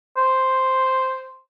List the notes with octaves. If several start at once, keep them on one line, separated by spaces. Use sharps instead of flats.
C5